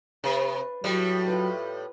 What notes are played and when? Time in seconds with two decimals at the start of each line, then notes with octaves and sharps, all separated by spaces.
0.24 C3 B4 B5
0.84 A2 F#3 G3
1.26 F4 B4